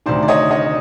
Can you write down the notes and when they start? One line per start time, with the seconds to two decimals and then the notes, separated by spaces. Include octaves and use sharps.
0.06 D2 C3 D#3 C5 D5
0.23 D5
0.28 C#5 D#5
0.51 C#5 D#5